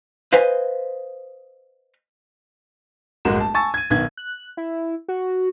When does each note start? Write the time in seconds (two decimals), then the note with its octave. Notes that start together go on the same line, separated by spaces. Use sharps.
0.33 B4 C5 D#5 F5 G#5
3.25 D1 G1 G#3 F#4 A#4 E7
3.40 A5
3.54 G#5 A5 C#6 E6 A6
3.74 G#6 D#7
3.90 B1 D#3 B3 G#6
4.17 F#6
4.57 E4
5.08 F#4